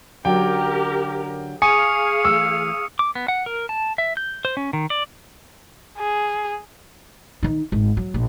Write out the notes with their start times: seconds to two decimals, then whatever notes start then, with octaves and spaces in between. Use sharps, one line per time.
0.25 D3 F#3 C#4 G4 A#4 G5
1.62 G#4 F5 G#5 C#6 D#6 C#7
2.25 E3 A3 E6
2.99 D6
3.15 B3
3.28 F#5
3.46 A#4
3.69 A5
3.98 E5
4.17 G6
4.45 C5
4.57 C#4
4.73 D#3
4.90 D5
5.99 G#4
7.43 D#3 D#4
7.72 G#1
7.97 F#3
8.14 A#1